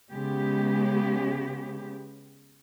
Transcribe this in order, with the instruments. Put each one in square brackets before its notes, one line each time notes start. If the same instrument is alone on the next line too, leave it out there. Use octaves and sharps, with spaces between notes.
[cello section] C#3 G#3 B3 G4